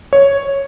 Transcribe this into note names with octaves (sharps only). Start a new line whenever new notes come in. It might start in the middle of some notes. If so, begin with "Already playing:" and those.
C#5